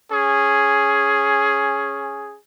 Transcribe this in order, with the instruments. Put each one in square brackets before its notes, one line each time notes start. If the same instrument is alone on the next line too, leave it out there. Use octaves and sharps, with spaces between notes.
[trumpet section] C#4 G#4